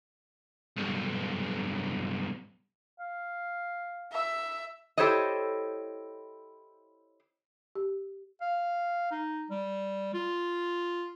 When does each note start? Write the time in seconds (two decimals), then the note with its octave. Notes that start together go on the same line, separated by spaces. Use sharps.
0.77 B1 G2
2.99 F5
4.12 E5
4.98 E4 G4 A4 C5 C#5 D#5
7.75 G4
8.41 F5
9.11 D#4
9.50 G3
10.14 F4